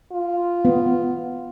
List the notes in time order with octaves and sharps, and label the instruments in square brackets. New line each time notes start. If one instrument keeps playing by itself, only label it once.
[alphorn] F4
[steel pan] B3